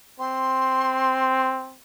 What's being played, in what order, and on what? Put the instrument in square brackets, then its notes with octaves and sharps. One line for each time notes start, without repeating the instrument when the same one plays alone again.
[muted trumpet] C4 [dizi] C6